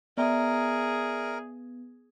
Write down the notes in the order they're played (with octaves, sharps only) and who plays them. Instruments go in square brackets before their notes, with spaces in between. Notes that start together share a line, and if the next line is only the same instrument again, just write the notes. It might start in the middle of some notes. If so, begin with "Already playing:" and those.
[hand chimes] B3 [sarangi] G#4 [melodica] A#4 [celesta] D5 E5 A#5